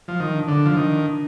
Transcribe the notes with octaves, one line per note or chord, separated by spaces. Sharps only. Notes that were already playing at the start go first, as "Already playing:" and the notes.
F3
D#3
D4
D3
F3
D#3